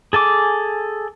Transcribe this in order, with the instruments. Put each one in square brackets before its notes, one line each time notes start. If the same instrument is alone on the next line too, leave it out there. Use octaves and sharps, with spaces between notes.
[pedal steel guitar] G#4 A4 G#5 D6